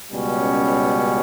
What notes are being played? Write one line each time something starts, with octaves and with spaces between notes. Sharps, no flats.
C#2 B2 G3 C#4